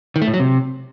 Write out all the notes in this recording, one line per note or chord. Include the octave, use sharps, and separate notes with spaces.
D#3
A3
A2
F#3
C3